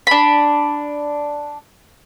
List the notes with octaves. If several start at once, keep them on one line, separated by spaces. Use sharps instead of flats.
D4 B5